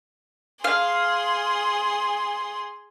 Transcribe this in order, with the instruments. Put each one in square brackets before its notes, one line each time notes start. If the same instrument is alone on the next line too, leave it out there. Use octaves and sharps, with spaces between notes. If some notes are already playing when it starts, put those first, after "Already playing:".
[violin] G#4 C6 [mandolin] F5